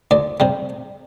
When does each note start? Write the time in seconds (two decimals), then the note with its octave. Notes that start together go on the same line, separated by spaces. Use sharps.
0.11 D2 D5
0.40 C3 G3